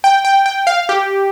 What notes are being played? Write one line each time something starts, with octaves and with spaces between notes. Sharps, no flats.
G5
G5
G5
F5
G4